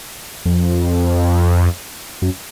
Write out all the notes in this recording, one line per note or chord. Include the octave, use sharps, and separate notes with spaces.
F2
F#2